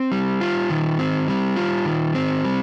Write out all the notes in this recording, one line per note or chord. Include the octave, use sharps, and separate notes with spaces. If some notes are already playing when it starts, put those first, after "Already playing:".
Already playing: C4
G3
F4
D#3
C4
G3
F4
D#3
C4
G3